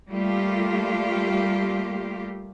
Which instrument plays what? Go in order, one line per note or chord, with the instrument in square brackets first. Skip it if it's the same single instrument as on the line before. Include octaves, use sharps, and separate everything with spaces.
[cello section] G3 A3 A#3 F4 G4